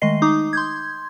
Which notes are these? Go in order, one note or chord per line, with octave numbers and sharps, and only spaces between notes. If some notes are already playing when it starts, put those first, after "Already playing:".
D#3 G#3 A3 D#5 C7
D#4 D6 D#6
C6 G6 G#6